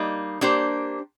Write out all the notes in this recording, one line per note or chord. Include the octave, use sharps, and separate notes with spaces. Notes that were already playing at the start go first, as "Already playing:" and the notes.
Already playing: G3 A#3 D#4
A#3 D4 G4 C5